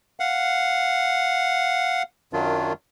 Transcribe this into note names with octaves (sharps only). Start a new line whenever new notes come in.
F5 F#5
F#2 D#3 F#3 D4 F4